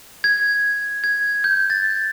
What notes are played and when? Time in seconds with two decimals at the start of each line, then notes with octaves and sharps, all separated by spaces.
0.24 G#6
1.04 G#6
1.44 G6
1.70 A6